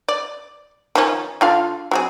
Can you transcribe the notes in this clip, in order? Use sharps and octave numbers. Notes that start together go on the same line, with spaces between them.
D5
D#3 F3 C#4
D3 F4 F5
F#3 C4 G#4